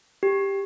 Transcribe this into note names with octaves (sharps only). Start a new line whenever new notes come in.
G4